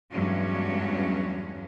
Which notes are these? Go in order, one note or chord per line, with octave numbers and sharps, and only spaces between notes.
E2 G2 F#3 G#3 C#4